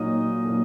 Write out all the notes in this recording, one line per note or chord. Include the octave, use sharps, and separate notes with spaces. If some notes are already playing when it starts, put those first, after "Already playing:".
Already playing: A#2 F#3 A#3 D#4 D#5
A#2 F#3 A#3